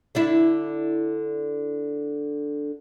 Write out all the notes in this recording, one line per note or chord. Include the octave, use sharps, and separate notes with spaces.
D3 D4 E4